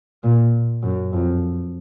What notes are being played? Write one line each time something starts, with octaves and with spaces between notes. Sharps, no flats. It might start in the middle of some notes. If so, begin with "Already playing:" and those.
A#2
F#2
F2